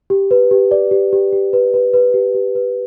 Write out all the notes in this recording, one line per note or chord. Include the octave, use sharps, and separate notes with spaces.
G4
B4
G4
D5
G4
G4
G4
B4
B4
B4
G4
G4
B4